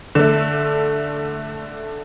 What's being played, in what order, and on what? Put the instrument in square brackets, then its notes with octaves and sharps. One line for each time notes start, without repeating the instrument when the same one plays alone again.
[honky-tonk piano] D3 A3